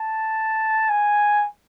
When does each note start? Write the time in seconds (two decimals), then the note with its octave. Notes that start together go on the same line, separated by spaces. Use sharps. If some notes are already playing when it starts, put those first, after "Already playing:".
Already playing: A5
0.89 G#5